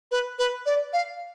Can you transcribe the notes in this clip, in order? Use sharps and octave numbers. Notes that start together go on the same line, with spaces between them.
B4
B4
D5
F5